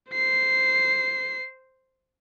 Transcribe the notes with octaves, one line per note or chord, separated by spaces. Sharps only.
C5 C7